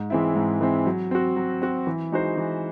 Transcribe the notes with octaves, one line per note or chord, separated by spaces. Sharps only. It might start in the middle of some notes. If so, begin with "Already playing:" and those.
Already playing: G#2
E3 G#3 C4 E4
G#2
E3 G#3 C4 E4
F#3
C4 F#4
F#3
C4 F#4
E3
G#3 D#4 F#4 C5
E3